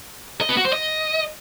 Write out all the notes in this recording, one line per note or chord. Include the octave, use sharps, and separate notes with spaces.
D#5
B3
F#4
C5
D#5